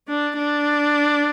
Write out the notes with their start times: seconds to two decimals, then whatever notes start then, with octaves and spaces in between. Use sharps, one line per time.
0.09 D4
0.38 D4